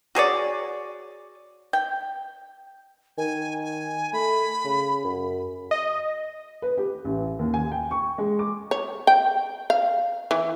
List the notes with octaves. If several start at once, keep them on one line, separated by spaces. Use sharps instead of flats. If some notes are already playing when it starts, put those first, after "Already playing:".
F#4 G#4 C#5 D5
G5
D#3 G#5
G#5
A3 B5
C#3
F#2
D#5
B4
G4
A1
D#2
G#5
G5
C#6
G#3
D6
C#5
G5
F5
E3